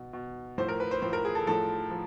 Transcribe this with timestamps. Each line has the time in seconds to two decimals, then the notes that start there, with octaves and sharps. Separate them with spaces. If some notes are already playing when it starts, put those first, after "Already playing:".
Already playing: B2
0.13 B2
0.58 A2 F3 C5
0.68 A#4
0.80 B4
0.91 C5
1.02 A2 F3 C5
1.13 A#4
1.25 G#4
1.35 A4
1.46 A2 F3 A4
1.91 F3